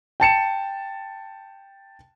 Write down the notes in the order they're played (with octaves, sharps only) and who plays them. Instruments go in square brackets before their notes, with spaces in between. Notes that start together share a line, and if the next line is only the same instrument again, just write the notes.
[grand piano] G5 A5 C#7 E7